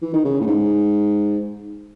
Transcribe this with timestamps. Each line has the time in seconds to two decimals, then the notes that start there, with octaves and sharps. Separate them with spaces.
0.02 E3
0.13 D#3
0.25 C#3
0.41 A2
0.47 G#2